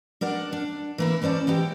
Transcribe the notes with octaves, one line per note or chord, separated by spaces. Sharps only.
D4 A#4 D5 F#5
D4
E3 A#3 E4
E3 C#4 C5 D5 A5
E3 G#3 G4 G5